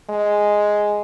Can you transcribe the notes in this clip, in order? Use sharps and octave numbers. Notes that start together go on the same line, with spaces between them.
G#3